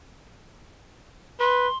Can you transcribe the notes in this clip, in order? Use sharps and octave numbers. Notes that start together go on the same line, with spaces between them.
B4 C6